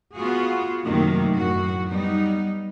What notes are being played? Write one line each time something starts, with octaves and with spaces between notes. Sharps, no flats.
B3 F4 F#4 G#4
F#2 A2 C3 D#3 A3 A#3
F#2 A2 F#4
G3 B3 D#4